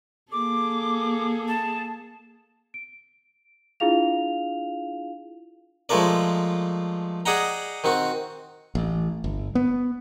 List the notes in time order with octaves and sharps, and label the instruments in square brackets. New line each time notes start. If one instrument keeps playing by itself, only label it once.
[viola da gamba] A#3 G#4 A4 [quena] D6
[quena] A5
[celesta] D7
D4 E4 F4 G#4 F5 F7
[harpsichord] F3 G#3 A3 F4 A#4 D5
G#4 D5 D#5 F#5 G5 A#5
D#3 C4 F#4
[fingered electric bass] A1
G1
B3